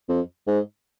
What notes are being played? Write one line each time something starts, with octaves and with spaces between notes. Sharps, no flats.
F2
G#2